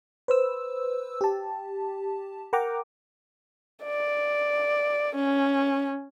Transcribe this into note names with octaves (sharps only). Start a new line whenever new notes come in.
B4 C5 E6
G4 A5
A#4 F#5 G5 A#5 D6
D5
C#4